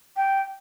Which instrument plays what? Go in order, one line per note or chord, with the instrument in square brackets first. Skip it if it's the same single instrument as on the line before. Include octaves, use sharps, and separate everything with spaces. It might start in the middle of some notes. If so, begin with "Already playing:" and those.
[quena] G5